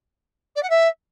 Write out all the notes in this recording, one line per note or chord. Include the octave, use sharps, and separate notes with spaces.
D5
F#5
E5